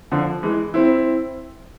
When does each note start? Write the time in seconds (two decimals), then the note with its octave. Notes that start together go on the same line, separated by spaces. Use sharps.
0.11 D3 F3
0.43 E3 G#3
0.74 C4 E4